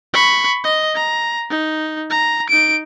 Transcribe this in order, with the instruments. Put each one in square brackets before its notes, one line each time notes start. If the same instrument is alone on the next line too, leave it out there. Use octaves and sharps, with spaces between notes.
[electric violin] B5 C#6
D#5
A#5
D#4
A#5
D#4 D7